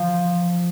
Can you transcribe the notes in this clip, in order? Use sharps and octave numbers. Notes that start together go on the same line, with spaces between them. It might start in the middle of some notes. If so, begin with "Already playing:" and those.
Already playing: F3